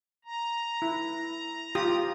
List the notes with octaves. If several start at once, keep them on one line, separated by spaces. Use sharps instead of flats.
A#5
E4
F4 G4 D#6